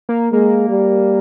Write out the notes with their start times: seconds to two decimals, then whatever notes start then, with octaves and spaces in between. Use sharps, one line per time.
0.09 A#3
0.33 G#3 A#3
0.69 G3